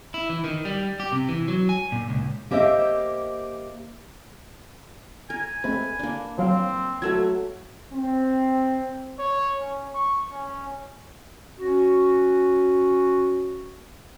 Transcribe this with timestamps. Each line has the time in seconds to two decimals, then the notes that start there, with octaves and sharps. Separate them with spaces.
0.14 E4
0.29 E3
0.44 D#3
0.65 G3
1.00 G4
1.12 C3
1.29 E3
1.48 F#3
1.69 G#5
1.92 A#2
2.09 C#2
2.51 A#3 G4 C5 D#5 E5
5.30 A#4 G#5
5.64 G#3 A3 C4 B4
5.99 A#3 D4
6.38 F3 F#3 C4 F5
7.02 F#3 A3 F#4 A4 E6 G#6
7.93 C4
9.19 C#5
9.61 C#4
9.95 C#6
10.32 C#4
11.59 C#4 F#4